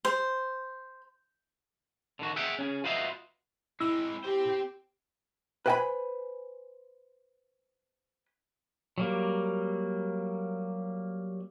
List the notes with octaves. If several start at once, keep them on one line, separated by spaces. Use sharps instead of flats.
C5
D3 D#3 F#4
G#4 E5 F#5 G5
C#4 G#4
F4 F#4 B4 C5 D#5 E5
G#3 C4 E4 B5 E6
C4 G4 C5
B4 C5 D#5 G5 G#5 B5
F#3 G3 A#3